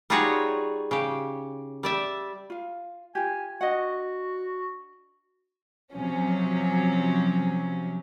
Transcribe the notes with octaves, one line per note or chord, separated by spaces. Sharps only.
G3 D#4 F4 F#4 G#4 C#5
C#3 G4
G3 D5 E5
F4 F5
F4 G4 G#5
D4 F#4 D#5 F#5
C3 F3 F#3 C#4